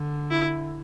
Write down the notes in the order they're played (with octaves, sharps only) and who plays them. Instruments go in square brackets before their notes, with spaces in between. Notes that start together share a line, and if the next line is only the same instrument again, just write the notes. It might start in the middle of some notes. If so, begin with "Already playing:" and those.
Already playing: [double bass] D3
[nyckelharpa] E4